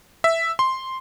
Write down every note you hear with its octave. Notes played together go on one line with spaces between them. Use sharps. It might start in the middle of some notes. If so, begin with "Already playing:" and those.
E5
C6